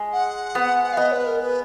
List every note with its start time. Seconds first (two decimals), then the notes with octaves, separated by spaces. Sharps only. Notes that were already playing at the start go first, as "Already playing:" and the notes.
Already playing: G#3
0.12 F#5
0.55 B3
0.92 F5
0.97 B3 D#5
1.12 B4
1.26 A#4
1.40 B4